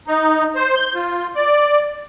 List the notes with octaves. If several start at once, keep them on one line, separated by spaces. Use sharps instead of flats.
D#4
C5
G6
F4
D5